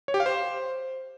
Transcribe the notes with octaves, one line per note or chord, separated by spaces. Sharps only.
C#5
G4
F5
C5